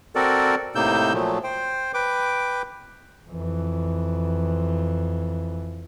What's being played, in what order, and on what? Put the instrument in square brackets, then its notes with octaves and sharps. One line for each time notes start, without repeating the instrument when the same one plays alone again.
[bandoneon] C4 F#4 A4 A#4 D5
A2 C3 A#3 D#4 E6 G6
A#2 F3 F#3 A3
C5 G5
B4 G5 D6
[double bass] F2 E3